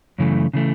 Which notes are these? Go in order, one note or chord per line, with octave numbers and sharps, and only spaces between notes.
F#2 C#3 E3 A3
C#3 E3 A3